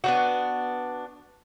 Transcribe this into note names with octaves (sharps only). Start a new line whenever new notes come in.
B3 D4 F#4